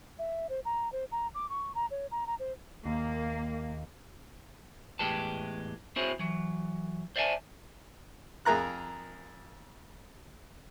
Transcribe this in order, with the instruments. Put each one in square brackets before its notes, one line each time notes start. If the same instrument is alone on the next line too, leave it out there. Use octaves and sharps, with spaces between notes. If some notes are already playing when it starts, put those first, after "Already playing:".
[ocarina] E5
C5
A#5
C5
A#5
D6
C#6
A#5
C#5
A#5
A#5
C5
[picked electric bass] D#2 [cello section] A#3
[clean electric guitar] E2 A2 G#3 G4 B4 A5
C4 E4 F#4 G#4 C5 C#5
E3 F#3
C5 D5 E5 F5 G#5 A5
[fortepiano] F2 G#4 A#4 A#5 F#6